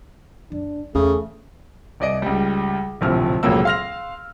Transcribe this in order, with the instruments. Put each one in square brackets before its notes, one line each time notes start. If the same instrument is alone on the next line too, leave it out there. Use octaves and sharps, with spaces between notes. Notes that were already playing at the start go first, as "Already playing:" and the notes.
[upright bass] F#1 [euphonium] D4
[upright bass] E2 [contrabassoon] C#3 [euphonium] A3
[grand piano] C2 D5 D#5 D7
C#2 G3
D1 A#1 C3 F3 F6
F1 C#2 A#2 F#3 A#3 E6
F5 C6 F6 A#6 F7